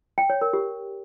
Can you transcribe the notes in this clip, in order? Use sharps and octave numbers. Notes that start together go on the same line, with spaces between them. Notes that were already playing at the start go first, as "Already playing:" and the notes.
G5
C#5
A#4
G4